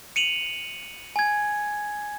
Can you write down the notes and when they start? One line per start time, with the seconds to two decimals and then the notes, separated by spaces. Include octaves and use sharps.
0.16 C#7 D#7 F7 F#7
1.16 G#5 G#6